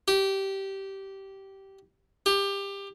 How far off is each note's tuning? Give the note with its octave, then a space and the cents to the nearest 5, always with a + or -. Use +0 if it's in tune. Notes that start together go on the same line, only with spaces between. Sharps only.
G4 -15
G4 +20